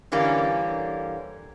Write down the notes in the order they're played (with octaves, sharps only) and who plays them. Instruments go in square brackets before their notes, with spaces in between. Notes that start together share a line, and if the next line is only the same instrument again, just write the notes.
[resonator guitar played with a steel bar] D3 E3 G3 A#3 C#4